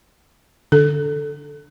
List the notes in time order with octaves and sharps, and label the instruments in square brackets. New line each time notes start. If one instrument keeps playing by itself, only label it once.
[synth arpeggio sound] D3 [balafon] A4